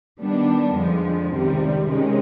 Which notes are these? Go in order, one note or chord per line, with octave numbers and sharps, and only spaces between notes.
D#3 G3 B3 D4
F2 D3 F3 G#3
C#2 C3 D#3 G3
C3 D#3 G#3 C#4